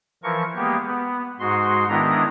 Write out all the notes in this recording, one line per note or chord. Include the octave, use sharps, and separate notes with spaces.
E3 F3 A#4 C#6
G#3 A#3 B3 G4
B3
G#2 G#3 F#4 C6
D#3 G#3 B3 D4 E4 A#5